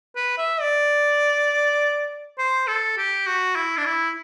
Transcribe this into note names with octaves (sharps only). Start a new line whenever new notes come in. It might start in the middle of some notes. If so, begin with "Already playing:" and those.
B4
E5
D5
C5
A4
G4
F#4
E4
D4
E4